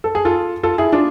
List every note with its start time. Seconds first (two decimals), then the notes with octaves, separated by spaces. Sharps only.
0.04 A4
0.15 G#4
0.25 F4 A4
0.63 F4 A4
0.78 E4 G#4
0.92 D4 F4